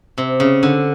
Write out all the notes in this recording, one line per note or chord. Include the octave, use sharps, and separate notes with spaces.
C3
C#3
D3